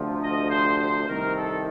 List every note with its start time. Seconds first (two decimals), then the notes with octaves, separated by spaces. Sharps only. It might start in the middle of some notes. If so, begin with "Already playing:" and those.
Already playing: D2 C3 F3
0.23 D#5
0.50 C5
0.79 C5
1.08 C2 C3 D#3 A#4
1.37 A4